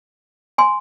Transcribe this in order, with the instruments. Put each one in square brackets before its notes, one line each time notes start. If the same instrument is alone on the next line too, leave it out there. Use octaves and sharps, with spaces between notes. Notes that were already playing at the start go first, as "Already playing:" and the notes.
[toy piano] G#5 C6